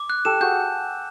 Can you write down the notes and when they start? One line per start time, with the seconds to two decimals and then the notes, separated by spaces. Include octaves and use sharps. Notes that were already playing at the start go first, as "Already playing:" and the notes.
Already playing: D6
0.10 F#6
0.25 G4 A4 E7
0.40 F#4 G#4 G6